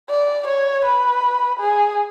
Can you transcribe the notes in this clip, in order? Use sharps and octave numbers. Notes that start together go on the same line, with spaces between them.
D5
C#5
B4
G#4